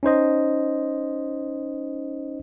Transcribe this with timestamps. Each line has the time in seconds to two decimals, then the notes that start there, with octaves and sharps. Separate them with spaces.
0.03 C#4 D#4 C5 D#5